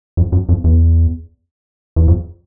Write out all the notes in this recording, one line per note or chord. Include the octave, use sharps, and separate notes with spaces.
F2
F#2
F2
E2
E2
F2